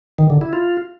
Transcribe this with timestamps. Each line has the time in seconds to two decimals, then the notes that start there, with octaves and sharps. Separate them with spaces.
0.18 D#3
0.30 D3
0.41 E4
0.53 F4